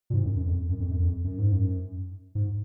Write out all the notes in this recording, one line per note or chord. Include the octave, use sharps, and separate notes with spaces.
A#2
G#2
F#2
F#2
F2
F#2
F2
F#2
F2
F#2
G#2
F#2
G#2